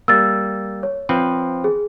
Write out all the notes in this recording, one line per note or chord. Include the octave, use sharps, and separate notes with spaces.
G3 A#3 E6 A6
C#5
F3 C4 B4
G#4